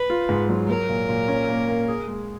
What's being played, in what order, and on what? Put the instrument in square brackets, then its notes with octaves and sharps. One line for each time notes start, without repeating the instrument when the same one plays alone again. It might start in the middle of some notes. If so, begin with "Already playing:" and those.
Already playing: [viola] B4
[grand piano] F4
G#2
F#3
[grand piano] F#3 [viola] A#4
[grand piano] A#2
A#2
C#4
A#3
A#3
G#4
G#3